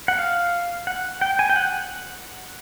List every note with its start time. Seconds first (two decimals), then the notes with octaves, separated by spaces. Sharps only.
0.08 F#5
0.19 F5
0.87 F#5
1.21 G5
1.39 G#5
1.49 G5
1.56 F#5